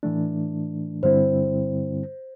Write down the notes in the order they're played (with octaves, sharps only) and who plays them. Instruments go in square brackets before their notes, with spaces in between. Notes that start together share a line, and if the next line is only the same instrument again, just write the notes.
[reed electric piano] A2 E3 A3 D4
[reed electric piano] G2 D3 G3 C4 E4 [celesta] C5